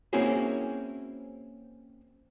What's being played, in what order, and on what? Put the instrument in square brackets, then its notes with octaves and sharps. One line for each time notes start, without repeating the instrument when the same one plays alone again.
[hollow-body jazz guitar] A#3 C4 C#4 E4 F#4 G#4